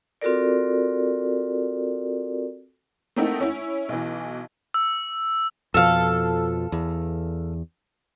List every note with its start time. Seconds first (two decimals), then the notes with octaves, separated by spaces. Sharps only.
0.22 C4 F4 F#4 A4 A#4 D5
3.16 A3 A#3 C4 D#4 E4 F#5
3.40 C#4 E4
3.89 B1 B2 E3
4.74 E6
5.74 F2 B2 F3 A4 F5
6.72 E2